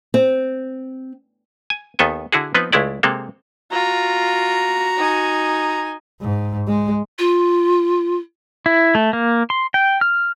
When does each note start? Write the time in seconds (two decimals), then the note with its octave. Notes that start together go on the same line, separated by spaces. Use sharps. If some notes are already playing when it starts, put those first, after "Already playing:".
0.14 C4
1.70 G#5
1.99 D#2 D#3 B3 A4 G#5
2.32 D3 E4 F#4 G#4
2.54 F3 B3 C4 D#4 B4
2.72 C#2 G#3 A3 E4 D5
3.03 C3 G#3 A#3 C4 A4
3.72 F4 F#4 A#5
4.97 D#4 G#5
6.22 G#2
6.67 G#3
7.19 F4
8.66 E4
8.95 A3
9.13 A#3
9.50 C6
9.74 G5
10.01 F6